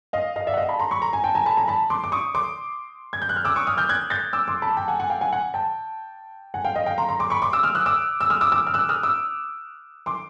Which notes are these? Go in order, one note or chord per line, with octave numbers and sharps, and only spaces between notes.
D#5 F5
D#5 F5
D5 E5
F#5
D#5 F5
A5 B5
A#5 C6
B5 C#6
A#5 C6
G#5 A#5
G5 A5
G#5 A#5
A5 B5
G#5 A#5
A5 B5
C6 D6
D6
C#6 D#6
C6 D6
G#6
G6
F#6
F6
D6 E6
C#6 D#6
D#6 F6
F6 G6
F#6 G#6
G6 A6
D6 E6
C6 D6
A5 B5
G5 A5
F#5 G#5
F#5 G#5
F5 G5
F#5 G#5
F#5 G#5
G5 A5
F#5 G#5
F5 G5
D#5 F5
F5 G5
A#5 C6
A#5 C6
C6 D6
B5 C#6
C6 D6
D6 E6
D#6 F6
E6 F#6
D6 E6
E6
D#6 F6
D6 E6
D6 E6
F6
E6 F#6
D#6 F6
D6 E6
C6 D6